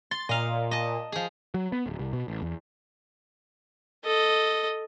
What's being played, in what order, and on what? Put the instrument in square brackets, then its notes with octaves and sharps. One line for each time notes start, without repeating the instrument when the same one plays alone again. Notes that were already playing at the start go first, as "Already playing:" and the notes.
[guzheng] C6 [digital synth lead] A6
[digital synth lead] A#2 [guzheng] D#5 F5
[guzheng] D#5 A5
F3 G#4
[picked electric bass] F#3
B3
D1
C2
B2
A1
E2
[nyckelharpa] A4 D#5